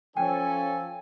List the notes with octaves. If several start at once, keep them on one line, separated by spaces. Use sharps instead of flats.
F3 C#4 A4 G5 G#5